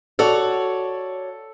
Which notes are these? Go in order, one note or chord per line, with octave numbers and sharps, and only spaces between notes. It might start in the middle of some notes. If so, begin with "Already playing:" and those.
F#4 A4 C#5 D5